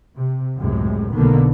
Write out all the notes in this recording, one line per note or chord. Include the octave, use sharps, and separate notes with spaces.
C3
C#2 F#2 A2 C3 G#3
B1 B2 D3 D#3 A#3 B3